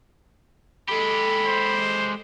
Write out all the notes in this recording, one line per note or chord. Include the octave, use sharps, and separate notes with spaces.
G#3 G4 A4 B5
C5